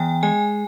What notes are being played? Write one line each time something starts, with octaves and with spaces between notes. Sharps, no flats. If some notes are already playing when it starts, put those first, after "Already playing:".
Already playing: E2 G5
G#3 G#5